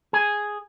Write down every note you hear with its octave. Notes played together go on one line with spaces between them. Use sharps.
G#4